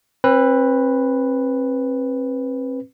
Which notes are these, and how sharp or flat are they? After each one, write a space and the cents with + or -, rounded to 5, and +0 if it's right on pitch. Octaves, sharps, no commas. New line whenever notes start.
C4 +35 B4 +0